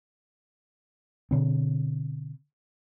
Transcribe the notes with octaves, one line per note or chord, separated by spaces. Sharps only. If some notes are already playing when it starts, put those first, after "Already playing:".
B2 D3 C4